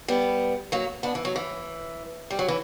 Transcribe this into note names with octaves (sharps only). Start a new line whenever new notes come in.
G3 B3
F#3 A#3
B3 D4
E3
F#3
E3
G3
F#3
E3